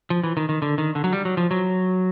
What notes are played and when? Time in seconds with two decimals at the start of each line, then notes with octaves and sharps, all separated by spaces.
0.10 F3
0.24 E3
0.37 D#3
0.49 D#3
0.62 D3
0.78 D#3
0.95 D3
1.04 F#3
1.13 G3
1.25 F#3
1.37 F3
1.51 F#3